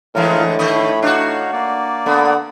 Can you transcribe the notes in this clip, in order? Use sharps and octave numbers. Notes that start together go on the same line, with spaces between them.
A2 D3 E3 G#3 F4 A#4
D#3 A3 C#5 D#5 B5
D4 D#4 F#4 C#5 F5
A#3 D5
D3 B3